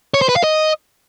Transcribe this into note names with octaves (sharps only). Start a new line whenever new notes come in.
C#5
C5
B4
F5
D#5